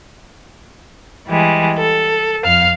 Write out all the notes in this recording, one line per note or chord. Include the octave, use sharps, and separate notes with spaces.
E3 G3 G#3
A4
F2 F5 F6